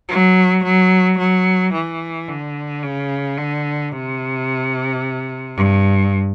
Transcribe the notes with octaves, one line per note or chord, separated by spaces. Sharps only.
F#3
F#3
F#3
E3
D3
C#3
D3
C3
G2